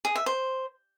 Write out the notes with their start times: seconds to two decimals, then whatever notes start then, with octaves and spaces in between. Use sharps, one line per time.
0.05 G#4
0.15 E5
0.26 C5